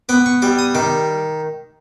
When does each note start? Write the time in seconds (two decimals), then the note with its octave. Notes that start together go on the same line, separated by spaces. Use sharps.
0.09 B3 D6
0.26 C#6
0.42 G3 D6
0.59 D#6
0.75 D#3 D6